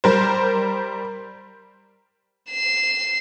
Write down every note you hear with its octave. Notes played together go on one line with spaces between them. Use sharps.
G3 A#4 C5
C7 E7